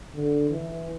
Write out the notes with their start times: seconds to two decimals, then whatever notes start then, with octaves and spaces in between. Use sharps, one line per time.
0.15 D3
0.49 E3